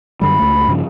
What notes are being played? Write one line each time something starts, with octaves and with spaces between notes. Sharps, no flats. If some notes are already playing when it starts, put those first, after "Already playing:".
F#2 D3 G3 B5
C#2 A3
G2 C#3 F3